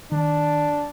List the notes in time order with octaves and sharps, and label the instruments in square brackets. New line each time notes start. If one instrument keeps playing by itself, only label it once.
[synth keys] D#3 [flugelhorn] D4